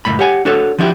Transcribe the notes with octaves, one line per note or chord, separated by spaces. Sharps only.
C#2 F#2 A2 B5
G4 C#5 F#5 G#5
D4 F#4 A4 C#5
F3 F#3 D4 E4 G4